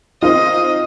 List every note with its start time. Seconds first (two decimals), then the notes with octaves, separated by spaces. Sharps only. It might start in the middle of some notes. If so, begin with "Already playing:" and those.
0.23 C4 D#4 F4 D#5